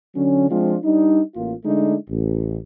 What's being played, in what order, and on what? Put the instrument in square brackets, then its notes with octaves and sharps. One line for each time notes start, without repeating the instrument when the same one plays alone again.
[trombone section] D3 F#3 C#4
F3 G#3 C4 D4 F4
G3 D4 D#4
A1 A#3 F4
D3 G#3 A3 D4 D#4
A1